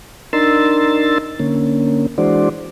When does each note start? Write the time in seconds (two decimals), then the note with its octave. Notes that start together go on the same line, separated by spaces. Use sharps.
0.33 D4 D#4 A#4 C6 E6 A6
1.40 D3 A#3 C#4
2.18 E3 G#3 D4 F#4 C5 D5